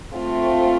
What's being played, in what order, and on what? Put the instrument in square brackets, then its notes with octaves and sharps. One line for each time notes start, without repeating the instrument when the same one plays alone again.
[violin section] A3 C4 F4